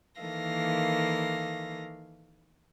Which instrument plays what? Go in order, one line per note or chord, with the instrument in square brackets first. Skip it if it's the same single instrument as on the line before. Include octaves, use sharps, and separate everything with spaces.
[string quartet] D#3 E3 A#3 A4 F5 A#6